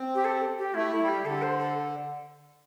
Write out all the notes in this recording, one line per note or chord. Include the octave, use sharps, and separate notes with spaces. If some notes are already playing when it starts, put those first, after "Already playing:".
Already playing: C4
G4
A4
G4
A3 E4
E4
G3
G4
D3 A4
C5
A4